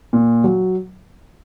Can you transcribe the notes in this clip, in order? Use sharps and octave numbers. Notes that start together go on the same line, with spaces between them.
A#2
F#3